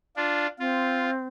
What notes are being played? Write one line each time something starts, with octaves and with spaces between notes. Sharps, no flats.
D4 F4
C4 F4